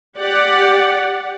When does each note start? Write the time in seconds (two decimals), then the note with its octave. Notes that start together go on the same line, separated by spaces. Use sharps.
0.18 G4 D5 F#5